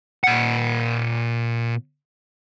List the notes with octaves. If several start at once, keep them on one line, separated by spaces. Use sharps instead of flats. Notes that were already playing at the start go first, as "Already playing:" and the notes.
A#2 F#5